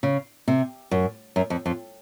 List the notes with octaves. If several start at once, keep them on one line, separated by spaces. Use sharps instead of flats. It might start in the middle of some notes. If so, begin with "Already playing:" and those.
C#3
C3
F#2
F#2
F2
F2